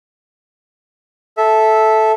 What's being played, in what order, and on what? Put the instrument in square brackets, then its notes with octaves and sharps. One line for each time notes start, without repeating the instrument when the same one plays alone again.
[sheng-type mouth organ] A4 E5